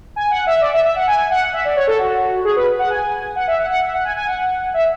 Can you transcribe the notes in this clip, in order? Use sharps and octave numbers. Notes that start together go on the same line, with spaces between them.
G#5
F#5
E5
D5
E5
E5
F#5
G#5
F#5
E5
D5
C#5
A4
F#4
G#4
B4
F#5
G#5
F#5
E5
F#5
F#5
E5
F#5
G#5
G#5
F#5
E5